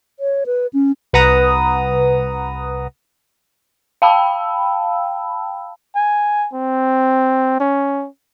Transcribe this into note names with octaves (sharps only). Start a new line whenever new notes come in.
C#5
B4
C#4
C2 B4 F#5 A#5 D#6
F5 G5 A5 B5 E6
G#5
C4
C#4